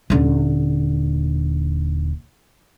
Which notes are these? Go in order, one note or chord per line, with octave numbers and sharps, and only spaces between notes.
D#1 D3